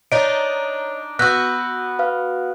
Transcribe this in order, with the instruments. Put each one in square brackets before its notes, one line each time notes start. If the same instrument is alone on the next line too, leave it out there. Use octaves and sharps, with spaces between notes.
[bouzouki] D4 D#4 [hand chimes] C#5 D#5 [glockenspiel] D7
[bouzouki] B3 F#4 [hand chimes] E6 G6 A#6 [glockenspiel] F#6
[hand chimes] B4 F5 F6